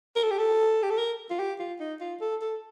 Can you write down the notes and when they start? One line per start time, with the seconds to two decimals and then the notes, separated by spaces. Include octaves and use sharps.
0.16 A#4
0.23 A4
0.31 G4
0.38 A4
0.83 G4
0.90 A4
0.98 A#4
1.30 F4
1.39 G4
1.59 F4
1.80 D#4
2.00 F4
2.21 A4
2.41 A4